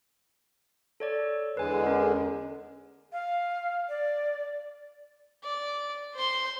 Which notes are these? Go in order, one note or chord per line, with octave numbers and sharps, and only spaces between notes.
A4 C#5 D5
E2 D3 G#3 B4 G#5
C#4 A#4
F5
D5
D5
C5 C6